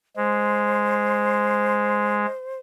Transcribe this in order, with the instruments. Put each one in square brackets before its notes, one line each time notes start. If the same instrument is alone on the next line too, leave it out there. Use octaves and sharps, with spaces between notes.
[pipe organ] G#3 [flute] C5